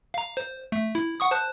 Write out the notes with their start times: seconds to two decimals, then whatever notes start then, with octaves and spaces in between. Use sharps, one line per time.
0.14 F5 A#5
0.37 C5
0.72 A3
0.95 E4
1.20 F#5 C#6 D#6
1.31 C5 A5 F#6